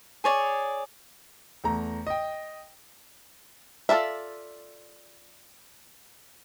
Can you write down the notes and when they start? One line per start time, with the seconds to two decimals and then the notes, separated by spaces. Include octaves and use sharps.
0.24 G#4 C#5 D5
1.64 E2 A3 A#5
2.07 D#5 G5
3.89 F4 A4 A#4 D5 E5